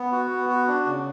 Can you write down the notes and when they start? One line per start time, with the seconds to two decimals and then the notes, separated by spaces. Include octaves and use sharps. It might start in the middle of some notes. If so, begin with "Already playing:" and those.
Already playing: B3
0.12 F#4
0.31 B3
0.49 F#4
0.68 D4
0.86 C#3